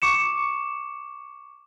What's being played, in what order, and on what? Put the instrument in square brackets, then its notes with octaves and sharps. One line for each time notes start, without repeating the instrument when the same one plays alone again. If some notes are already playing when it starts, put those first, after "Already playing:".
[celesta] C#6 D6 C#7 E7